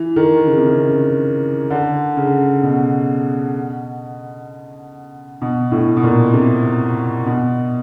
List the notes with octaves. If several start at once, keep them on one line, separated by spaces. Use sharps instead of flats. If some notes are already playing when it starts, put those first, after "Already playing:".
Already playing: E3
D#3
C#3
C3
C#3
D3
C#3
B2
B2
A2
B2
A#2
C3
B2